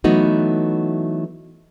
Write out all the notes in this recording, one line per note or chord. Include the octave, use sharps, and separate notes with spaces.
E3 F#3 A3 B3 D#4 F#4